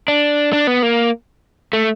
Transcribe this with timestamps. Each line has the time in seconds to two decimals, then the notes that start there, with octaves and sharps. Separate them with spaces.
0.08 D4
0.53 D4
0.67 B3
0.82 A#3
1.73 A3